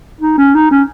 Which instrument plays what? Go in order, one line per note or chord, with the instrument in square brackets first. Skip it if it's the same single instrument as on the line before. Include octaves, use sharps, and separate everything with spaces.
[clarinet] D#4
C#4
D#4
C#4